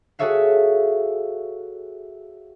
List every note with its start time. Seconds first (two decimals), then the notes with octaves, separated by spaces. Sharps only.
0.19 F#4 G#4 A4 C#5 E5 F5